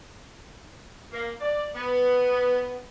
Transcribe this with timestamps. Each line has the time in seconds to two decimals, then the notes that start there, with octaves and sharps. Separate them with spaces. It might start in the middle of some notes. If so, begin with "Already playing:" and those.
1.11 A#3
1.40 D5
1.73 B3